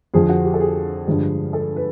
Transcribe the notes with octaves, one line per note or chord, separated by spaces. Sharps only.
F2 D3 F3 G#4
F#4
G4
A4
G#4
G2 D3 F3 G#3
A4
B4